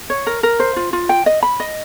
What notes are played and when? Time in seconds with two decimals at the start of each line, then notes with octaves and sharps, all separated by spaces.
0.10 C#5
0.27 A#4
0.43 A#4
0.60 C5
0.76 F4
0.93 F4
1.09 G5
1.26 D#5
1.43 B5
1.60 D#5